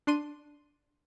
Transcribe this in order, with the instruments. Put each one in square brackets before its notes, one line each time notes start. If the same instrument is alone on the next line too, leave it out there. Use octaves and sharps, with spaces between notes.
[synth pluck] D4 C6 D#7